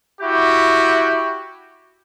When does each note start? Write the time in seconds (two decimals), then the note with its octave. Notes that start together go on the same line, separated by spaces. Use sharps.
0.21 E4 F#4 G4